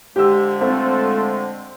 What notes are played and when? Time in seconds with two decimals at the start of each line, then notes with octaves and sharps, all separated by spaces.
0.16 D3 F3 G#3 G4 E6
0.61 A3 C4 F4 A4